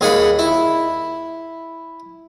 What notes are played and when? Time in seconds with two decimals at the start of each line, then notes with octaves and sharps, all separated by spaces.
0.01 D#2 G#4 F5 F#5 B5
0.39 E4